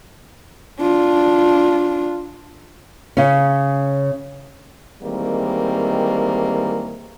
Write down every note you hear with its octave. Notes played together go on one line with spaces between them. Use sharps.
D4 F4
C#3 C#4
D#3 E3 G3 G#3 A#3 C4